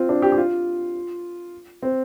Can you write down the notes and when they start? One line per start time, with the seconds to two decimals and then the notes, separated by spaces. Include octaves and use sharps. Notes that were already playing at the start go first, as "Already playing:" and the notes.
Already playing: C4 F4
0.09 D4
0.22 G4
0.32 G4
0.38 F4
1.83 C4